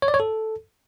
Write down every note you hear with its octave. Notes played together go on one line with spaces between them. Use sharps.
C#5
D5
C#5
A4